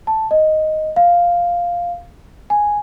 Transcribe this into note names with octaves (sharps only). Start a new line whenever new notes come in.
A5
D#5
F5
G#5